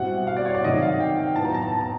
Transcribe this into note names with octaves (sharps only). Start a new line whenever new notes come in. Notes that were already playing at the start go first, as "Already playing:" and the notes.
Already playing: B2 G3 C4 E4 F#5
F5
D5
C#5
D5
C3 D#3 F#3 A3 D#5
F5
G5
G5
A2 F#3 B3 A5
A#5
A5
A#5
A5
A#5